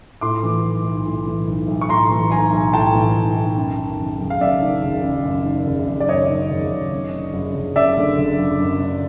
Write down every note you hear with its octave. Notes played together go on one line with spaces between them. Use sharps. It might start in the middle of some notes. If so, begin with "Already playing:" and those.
A2 C6 D6
E3
B1
B1
A2
E3
B1
B1
C#6
A2 A#5 C6
E3
B1 G#5 A#5
B1
A2 G5 A5
E3
B1
B1
F#2
D#3
F#1
F#1
F5
F#2 D5 E5
D#3
F#1
F#1
F#2
D#3
F#1
F#1
D5
F#2 C#5 D#5
D#3
F#1
F#1
F#2
D3
F#1
F#1
F#2 D5 E5
D3
F#1
F#1
F#2
D3